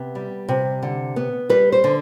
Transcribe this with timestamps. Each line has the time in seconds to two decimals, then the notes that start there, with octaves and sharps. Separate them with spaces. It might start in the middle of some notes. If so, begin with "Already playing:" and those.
Already playing: C3 B3
0.15 G3
0.49 C3
0.83 D3
1.16 B3
1.49 G3 B4
1.72 C5
1.84 D3